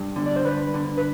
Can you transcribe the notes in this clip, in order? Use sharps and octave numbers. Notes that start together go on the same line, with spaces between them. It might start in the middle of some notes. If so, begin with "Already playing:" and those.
Already playing: G2
D3
D5
C5
G2 B4
D3
B4